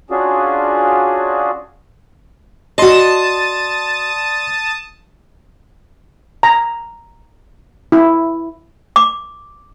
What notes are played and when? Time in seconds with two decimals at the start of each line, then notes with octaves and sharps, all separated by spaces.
0.10 C#4 D4 F4 F#4 G#4
2.78 F#4 D5 D#5 A5 C6 D#6
6.43 A#5
7.92 E4
8.96 D6